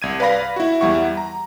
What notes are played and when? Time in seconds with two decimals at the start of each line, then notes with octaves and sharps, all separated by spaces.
0.02 C2 G#6 D#7
0.20 B4 D5 F5 B5 A#6
0.56 E4 F#4
0.81 E2 G3 E4 F#5 C#6
1.17 A#5